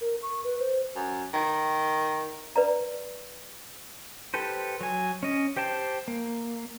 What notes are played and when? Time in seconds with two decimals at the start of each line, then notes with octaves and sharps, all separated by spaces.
0.01 A#4
0.22 C#6
0.44 B4
0.59 C5
0.96 F#2
1.34 D#3
2.56 B4 D5 A#5
4.34 G4 A4 B4 C5
4.81 F#3 G#5
5.23 C#4 D#5
5.56 G4 C5 G5 A5
6.08 A#3